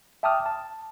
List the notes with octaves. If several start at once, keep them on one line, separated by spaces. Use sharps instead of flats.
E5 G5 A5 D6 D#6 F6
A5